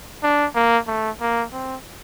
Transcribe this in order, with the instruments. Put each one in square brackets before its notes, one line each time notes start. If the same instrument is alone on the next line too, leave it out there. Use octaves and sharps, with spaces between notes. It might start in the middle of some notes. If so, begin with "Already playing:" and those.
[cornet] D4
A#3
A3
A#3
C4